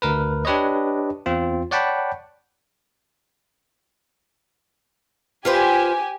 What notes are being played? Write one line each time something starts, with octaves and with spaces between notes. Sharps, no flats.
D2 A#4 B4
D4 G4 B4 C#5 D#5
E2 C4 F4
C#5 D5 F#5 G5 A5 B5
F4 G4 B4 C5 G#5